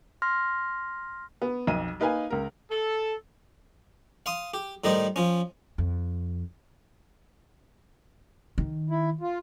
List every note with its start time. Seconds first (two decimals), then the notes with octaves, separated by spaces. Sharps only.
0.22 C6 F6 A#6
1.42 B3
1.67 B1 F2 D#5 D#7
2.00 A#3 D#4 B4 F5 G#5
2.30 C#2 A#4
2.71 A4
4.26 F5 C6 D#6
4.54 G4
4.84 A2 D#3 G3 D#4 C5
5.16 F3 C#4
5.78 F2
8.58 D#3
8.90 E4
9.21 F4